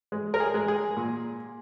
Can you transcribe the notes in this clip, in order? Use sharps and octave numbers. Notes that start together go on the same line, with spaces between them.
G#3
A#4
G#4
G#3
G#4
A#2